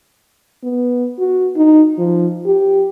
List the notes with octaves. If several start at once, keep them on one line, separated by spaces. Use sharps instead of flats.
B3
F#4
D#4
F3
G4